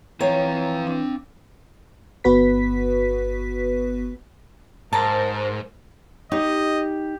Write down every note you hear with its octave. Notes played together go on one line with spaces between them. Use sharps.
E3 C4 C#5 F5 G5 A#5
D4
G1 B3 F#4 B4 B6
G#2 A#4 C5 A5 A#5
D#4 G4 D#5